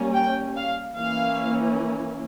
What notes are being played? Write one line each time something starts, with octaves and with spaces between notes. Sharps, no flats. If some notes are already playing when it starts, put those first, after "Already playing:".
Already playing: G3 A#3 C#4
G5
F5
E3 A#3 C#4 F5